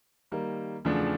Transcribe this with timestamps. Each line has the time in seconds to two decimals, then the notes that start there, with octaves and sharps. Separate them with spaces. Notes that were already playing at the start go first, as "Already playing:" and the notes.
0.32 D#3 G3 A#3
0.85 E2 C#3 F3 A3 D4